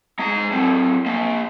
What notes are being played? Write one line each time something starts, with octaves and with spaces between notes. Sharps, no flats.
G#3 A#5
F#3 C4
F3 A#3